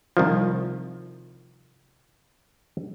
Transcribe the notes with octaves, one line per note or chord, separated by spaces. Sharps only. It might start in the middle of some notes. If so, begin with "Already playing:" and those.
C2 D#3 F3